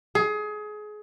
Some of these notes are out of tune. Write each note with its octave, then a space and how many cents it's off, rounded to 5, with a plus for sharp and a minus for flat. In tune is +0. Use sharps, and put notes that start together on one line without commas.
G#4 +25